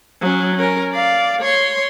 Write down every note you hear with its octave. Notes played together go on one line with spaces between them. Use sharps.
F#3 C#4
C#4 A#4
D5 F5
C#5 C6